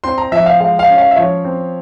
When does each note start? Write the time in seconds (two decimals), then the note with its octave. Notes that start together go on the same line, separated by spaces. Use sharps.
0.04 C4 C6
0.18 A#5
0.32 F3 E5
0.46 F5
0.60 G#3 F5
0.79 F5
0.88 C#4
0.98 F5
1.11 E5
1.16 F3 C#5
1.45 C4